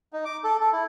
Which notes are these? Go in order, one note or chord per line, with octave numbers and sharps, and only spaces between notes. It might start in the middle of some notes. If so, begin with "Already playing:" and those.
D#4
D6
A4
A4
E4